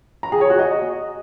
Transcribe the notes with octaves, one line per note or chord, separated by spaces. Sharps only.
A#5
G#4
C#5
F#4
D#5